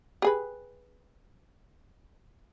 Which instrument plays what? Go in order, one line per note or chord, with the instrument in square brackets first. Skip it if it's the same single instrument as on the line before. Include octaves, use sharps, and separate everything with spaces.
[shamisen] G4 G#4 B4